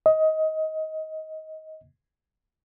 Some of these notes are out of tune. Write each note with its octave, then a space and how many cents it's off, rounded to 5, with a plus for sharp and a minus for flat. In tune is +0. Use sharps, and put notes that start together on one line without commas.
D#5 +20